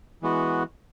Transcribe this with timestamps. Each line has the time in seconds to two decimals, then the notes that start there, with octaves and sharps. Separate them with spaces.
0.22 E3 G#3 B3 F#4